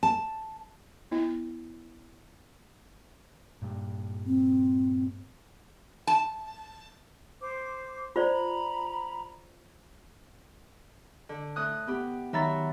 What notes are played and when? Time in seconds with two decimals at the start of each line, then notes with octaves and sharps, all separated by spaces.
0.03 A5
1.11 B3 E4
3.62 G2 A#2
4.26 C4
6.07 A5
7.41 C5 D6
8.16 F4 C5 D5 A#5 B5
11.29 D3
11.56 A2 D#6 F#6
11.87 B3 G4
12.33 D#3 F#3 E5 A#5 B5 A6